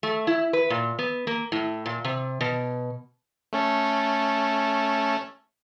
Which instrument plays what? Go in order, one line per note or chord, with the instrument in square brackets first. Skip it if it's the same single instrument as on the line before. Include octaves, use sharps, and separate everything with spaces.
[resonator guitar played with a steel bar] A3
E4
B4
A#2
B3
A#3
A2
A#2
C3
B2
[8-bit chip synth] A3 C#4 A4